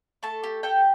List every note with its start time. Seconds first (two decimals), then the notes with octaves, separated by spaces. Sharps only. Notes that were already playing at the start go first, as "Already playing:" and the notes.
0.23 A3 A4 A5
0.43 G4
0.63 G4 A4 G5